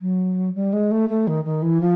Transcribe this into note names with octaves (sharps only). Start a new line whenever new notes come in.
F#3
G3
G#3
A3
A3
D#3
D#3
E3
F3